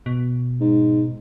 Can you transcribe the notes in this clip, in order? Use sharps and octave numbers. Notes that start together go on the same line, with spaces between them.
B2
G#2